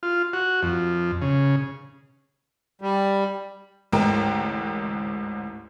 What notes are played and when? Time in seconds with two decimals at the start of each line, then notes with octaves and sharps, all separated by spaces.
0.03 F4
0.33 F#4
0.63 F2
1.22 C#3
2.81 G3
3.92 A1 D2 G#2 A#4 G5